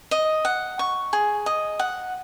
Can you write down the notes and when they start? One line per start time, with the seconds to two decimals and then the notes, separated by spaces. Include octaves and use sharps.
0.11 D#5
0.45 F#5
0.79 C#6
1.13 G#4
1.46 D#5
1.79 F#5